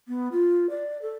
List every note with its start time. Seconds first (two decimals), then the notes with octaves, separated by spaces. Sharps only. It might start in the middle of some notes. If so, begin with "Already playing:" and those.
0.08 B3
0.32 F4
0.70 D5
1.02 A4